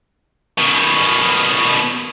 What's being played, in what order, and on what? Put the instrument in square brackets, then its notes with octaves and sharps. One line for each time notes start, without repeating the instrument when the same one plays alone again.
[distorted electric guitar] B2 D#3